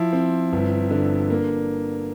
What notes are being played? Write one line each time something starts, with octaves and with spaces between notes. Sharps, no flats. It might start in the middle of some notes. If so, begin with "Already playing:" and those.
Already playing: F3 E4
C4
G1
D3
A#3